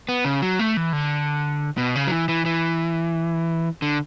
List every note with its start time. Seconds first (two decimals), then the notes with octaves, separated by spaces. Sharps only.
0.09 B3
0.25 C#3
0.42 F#3
0.59 A3
0.77 E3
0.93 D3
1.78 B2
1.96 C#3
2.07 F#3
2.12 E3
2.28 E3
2.45 E3
3.82 D3